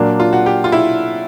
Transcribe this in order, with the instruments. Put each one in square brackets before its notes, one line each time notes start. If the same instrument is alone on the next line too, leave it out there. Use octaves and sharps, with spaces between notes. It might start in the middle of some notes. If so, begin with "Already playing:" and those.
Already playing: [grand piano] A#2 F#3 A#3 D4
[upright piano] F4
F#4
G4
F4
E4